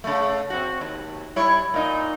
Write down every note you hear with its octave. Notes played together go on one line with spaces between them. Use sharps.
C#3 A3
C4 F#4
D#2
G3 E4 C#5
A#2 D#4